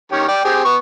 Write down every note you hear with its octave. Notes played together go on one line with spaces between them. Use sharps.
D#3 C#4 G4
D5 G5
C4 G4 G#4
B3 C#6